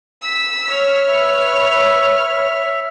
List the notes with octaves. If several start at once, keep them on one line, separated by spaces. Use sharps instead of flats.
E6 B6
C#5 F6
B4 E5